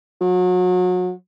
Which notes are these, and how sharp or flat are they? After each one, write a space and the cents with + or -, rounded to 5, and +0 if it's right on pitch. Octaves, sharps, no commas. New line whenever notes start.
F#3 -30